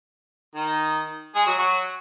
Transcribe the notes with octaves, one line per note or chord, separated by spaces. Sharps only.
D#3 D#4
G#3 G#4
F#3 F#4
F#3 F#4